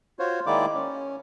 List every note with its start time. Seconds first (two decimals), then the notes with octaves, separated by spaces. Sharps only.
0.19 F4 F#4 C5 C#5
0.47 D#3 G#3 A#3 E4 D5 D6
0.75 C#4